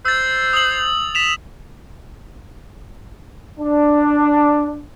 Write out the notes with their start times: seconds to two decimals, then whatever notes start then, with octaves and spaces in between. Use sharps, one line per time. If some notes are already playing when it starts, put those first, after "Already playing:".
0.05 C5 E6 A6
0.53 D#6 F#7
1.15 B6 E7 F7
3.59 D4